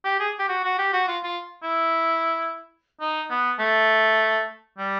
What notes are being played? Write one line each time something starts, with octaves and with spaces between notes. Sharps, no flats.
G4
G#4
G4
F#4
F#4
G4
F#4
F4
F4
E4
D#4
B3
A3
G3